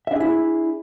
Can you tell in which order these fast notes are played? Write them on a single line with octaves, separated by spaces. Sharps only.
E5 D4 G#4 E4